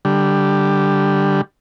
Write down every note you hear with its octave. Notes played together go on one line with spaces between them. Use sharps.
D3 G3